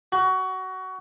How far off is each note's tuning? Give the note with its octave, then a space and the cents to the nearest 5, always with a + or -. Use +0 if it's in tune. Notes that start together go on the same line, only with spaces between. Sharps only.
F#4 +20